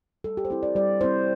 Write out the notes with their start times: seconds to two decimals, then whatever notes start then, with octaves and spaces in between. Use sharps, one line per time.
0.24 G3 A4
0.37 G4
0.45 C5
0.50 C4 E4 A4
0.63 D5
0.76 G3 D5
1.01 C4 E4 C5